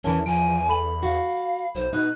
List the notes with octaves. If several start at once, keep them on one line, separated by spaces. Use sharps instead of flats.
E2 E3 C#4 A#4 A5
E2 F3 G#5 D7
A4 B5 F#7
F#4 F5
B1 C5
B2 D#4 F#6